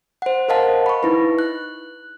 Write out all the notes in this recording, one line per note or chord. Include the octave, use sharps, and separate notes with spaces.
C5 F#5
A#4 C5 D#5 F5 F#5 A5
B5 C#6
D#4 E4 B4
F#6